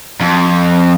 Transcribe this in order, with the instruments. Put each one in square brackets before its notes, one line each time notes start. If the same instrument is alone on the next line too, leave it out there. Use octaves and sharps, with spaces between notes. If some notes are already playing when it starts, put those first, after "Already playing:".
[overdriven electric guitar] F2